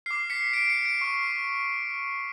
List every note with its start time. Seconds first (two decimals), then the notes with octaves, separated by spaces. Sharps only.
0.06 D6 F6 C7
0.30 B6 C#7
0.53 C7 D7
0.69 B6 C#7
0.85 C7 D7
1.01 C#6 F6